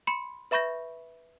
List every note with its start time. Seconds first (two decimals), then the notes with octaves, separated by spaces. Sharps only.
0.07 B5 C6 C#7
0.51 B4 E5 B5 C#6 G6 A#6